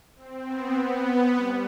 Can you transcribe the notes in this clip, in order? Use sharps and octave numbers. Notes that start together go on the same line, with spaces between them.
C4
B3
G3